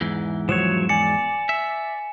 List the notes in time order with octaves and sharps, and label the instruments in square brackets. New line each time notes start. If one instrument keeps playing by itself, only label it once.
[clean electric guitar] E2 G#2 E3
[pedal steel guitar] F3 F#3 C#5 [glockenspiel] E7
[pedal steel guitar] D5 [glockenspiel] G#5 C#7
[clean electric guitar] E5